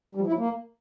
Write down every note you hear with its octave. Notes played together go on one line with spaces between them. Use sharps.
G3
F3
E4
F#3
A#3